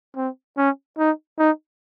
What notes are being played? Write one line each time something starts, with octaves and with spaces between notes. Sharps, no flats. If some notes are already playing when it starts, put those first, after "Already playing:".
C4
C#4
D#4
D#4